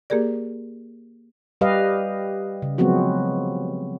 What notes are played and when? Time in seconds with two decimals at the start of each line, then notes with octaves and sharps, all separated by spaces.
0.10 A#3 G4 G#4 A#4 D5
1.61 G3 G4 B4 D#5 F5
2.62 C#3
2.78 F3 F#3 G#3 B3 C4 F#4